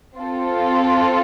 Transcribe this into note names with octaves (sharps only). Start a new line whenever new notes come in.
C4 F4 A4